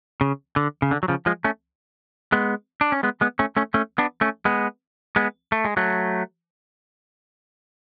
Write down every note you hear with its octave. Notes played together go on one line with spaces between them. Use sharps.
C#3
D3
C#3
D3
F#3
C#3 F3
F3 G#3
A3 C#4
G#3 B3
D4
C#4
G#3 B3
G#3 B3
A3 C#4
A3 C#4
A3 C#4
B3 D4
A3 C#4
G#3 B3
G#3 B3
A3
G#3
F#3 A3